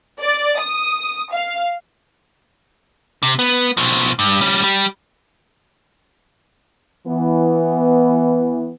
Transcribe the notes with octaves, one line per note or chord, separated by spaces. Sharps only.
D5
D#6
F5
C3
B3
B2 F3
G2
G3 C#4
G3
E3 B3